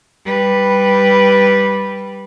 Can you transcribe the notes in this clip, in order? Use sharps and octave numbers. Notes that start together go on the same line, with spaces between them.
G3 B4